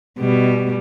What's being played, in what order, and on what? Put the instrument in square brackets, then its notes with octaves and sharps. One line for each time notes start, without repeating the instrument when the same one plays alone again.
[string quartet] B2 [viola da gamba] G3